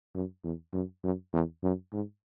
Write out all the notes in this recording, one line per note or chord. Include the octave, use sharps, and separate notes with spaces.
F#2
E2
F#2
F#2
E2
F#2
G#2